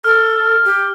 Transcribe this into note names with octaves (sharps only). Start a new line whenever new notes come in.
A4 F6
G4